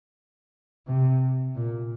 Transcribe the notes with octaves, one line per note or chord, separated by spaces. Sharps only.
C3
A#2